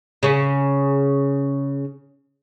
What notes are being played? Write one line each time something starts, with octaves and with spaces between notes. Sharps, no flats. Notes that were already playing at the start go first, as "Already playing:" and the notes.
C#3 C#4